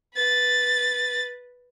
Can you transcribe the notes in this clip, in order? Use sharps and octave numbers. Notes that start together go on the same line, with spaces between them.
B4 A6